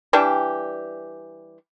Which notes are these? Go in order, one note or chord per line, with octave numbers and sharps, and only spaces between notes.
E3 G3 D4 G4